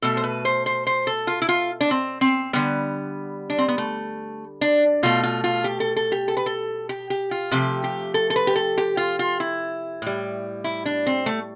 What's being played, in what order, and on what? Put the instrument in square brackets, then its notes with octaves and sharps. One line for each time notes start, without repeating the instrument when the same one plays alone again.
[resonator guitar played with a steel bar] B2 A3 A4
C5
B4
C5
C5
C5
A4
F4
E4
F4
D4
C4
C4
D3 G3 B3
D4
C4
B3
A3
D4
B2 A3 F4
F4
F4
G4
A4
A4
G4
A4
B4
A4
G4
G4
F4
C3 F3 A3 G4
G4
A4
A4
B4
G4
A4
G4
F4
F4
E4
A2 G3
E4
D4
C4
A3